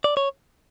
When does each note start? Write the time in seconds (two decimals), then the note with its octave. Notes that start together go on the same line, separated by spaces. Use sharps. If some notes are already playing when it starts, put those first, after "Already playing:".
0.04 D5
0.17 C#5